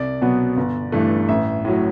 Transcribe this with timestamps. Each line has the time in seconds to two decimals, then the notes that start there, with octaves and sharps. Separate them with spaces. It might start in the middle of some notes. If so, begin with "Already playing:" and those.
Already playing: C2 D5
0.21 B2 F#3 B3
0.57 G1
0.92 G2 E3 A3
1.29 A1 E5
1.65 A2 F#3